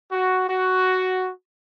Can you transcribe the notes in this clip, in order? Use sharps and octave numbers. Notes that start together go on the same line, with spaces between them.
F#4
F#4